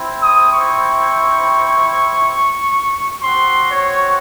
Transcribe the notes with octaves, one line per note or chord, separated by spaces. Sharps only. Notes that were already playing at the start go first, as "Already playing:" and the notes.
Already playing: C4 E4
D#6
C#6
C4 F#4 C6
C#5